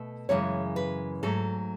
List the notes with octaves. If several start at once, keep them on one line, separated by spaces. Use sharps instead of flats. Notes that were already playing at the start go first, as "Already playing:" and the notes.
Already playing: B2 A3
F#2 C#3 E3 G#3 C#5
B4
G#2 F#3 A3 A4